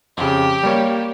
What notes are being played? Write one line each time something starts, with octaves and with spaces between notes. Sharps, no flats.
F2 C#3 G4
G3 A#3 C#5